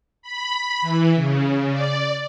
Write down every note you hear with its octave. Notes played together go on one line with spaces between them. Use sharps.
B5
E3
C#3
D5